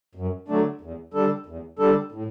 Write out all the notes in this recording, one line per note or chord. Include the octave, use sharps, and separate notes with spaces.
F#2
D3 F#3 A3 D4
E2
D3 G3 D4 A4
E2
D3 G3 D4 A4
A2